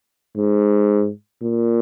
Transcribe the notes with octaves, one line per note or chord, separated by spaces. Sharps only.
G#2
A#2